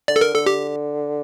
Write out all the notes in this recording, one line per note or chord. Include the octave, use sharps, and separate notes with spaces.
D3 D5
A4
A#4
D3 A4
G4